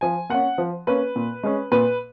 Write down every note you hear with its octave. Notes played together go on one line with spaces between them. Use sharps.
F3 G#5
A#3 C#4 F#5
F3
A#3 C#4 B4
A#2
G#3 C#4
A#2 B4